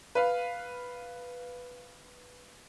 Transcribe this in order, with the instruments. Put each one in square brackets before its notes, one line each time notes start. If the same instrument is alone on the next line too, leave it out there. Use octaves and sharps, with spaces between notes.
[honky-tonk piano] B4 F5